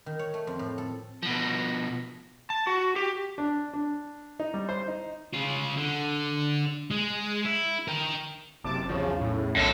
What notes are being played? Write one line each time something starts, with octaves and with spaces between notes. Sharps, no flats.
D#3
C#5
A3
F2
A2
A4
B2 F3
A5
F#4
G4
D4
D4
D#4
G3
C5
D#4
C#3 F4
D3
G#3
E4
A#4 G5
F#1 C3 A5 D6
B1 E2 C#3 F3
A2
B1 F#2 A4